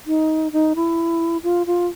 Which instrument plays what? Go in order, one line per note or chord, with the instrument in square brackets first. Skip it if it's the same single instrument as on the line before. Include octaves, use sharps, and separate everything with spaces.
[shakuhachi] D#4
D#4
E4
F4
F4